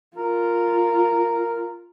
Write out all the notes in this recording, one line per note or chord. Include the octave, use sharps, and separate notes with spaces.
F4 A#4